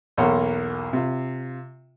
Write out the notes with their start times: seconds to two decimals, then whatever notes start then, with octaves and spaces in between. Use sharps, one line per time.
0.17 B1 E2 A#3 C#5 F#5 C6
0.93 C3 F4